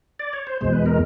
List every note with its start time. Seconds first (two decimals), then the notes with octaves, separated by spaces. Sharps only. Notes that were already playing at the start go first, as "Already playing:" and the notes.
0.19 D5
0.33 C#5
0.47 C5
0.61 E2 B2 G#3 C5
0.73 B4
0.86 A#4